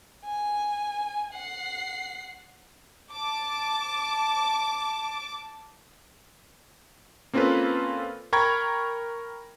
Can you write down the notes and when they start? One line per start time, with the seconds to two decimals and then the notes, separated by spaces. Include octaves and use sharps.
0.24 G#5
1.33 F#5 C7
3.11 A5 D6
7.33 A#3 C4 C#4 F4 A4 B4
8.33 A#4 G5 A#5 B5 C#6 G#6